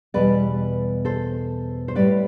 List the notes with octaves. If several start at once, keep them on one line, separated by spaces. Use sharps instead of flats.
E2 B2 G3 B4 D5
A4 C5
C5
A2 G3 B4 D5